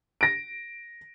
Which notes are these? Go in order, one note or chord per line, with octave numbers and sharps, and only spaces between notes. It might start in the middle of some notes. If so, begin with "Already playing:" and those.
A#6 D7